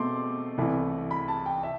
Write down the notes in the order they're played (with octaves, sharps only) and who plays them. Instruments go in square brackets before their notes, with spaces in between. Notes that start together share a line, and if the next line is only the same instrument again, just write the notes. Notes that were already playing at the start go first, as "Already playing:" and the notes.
Already playing: [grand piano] B2 A3 C4 C6 D6
C2 C3 E3 A3
B5
A5
G5
E5